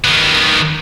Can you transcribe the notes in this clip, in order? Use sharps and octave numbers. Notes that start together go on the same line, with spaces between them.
D#3 B3